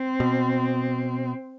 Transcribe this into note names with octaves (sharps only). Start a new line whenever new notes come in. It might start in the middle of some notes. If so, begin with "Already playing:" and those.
Already playing: C4
B2